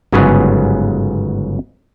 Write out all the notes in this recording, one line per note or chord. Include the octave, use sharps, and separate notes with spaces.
G1 G#2 C#3 F#3 B3 G#4